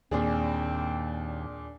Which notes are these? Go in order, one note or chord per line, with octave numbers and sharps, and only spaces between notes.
D#2 A#2 C4 D4 G#4